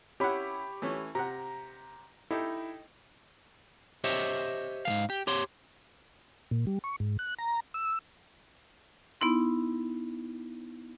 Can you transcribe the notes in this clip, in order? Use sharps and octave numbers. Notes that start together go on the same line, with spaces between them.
C#4 E4 G4 C#5 F#5 B5
E3 A3 C#4
C3 F#5 A#5
D#4 E4 G4 A4
G4 C5 C#5 D#5 E5
G#2 E3 F5
G4
G4 C#5 C6
A#2
G3
C#6
G#2
F#6
A#5
E6
B3 D#4 E4 C6